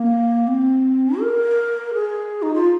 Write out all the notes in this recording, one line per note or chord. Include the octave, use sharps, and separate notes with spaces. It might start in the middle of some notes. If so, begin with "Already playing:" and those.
Already playing: A#3
C4
A#4
G#4
D#4
F4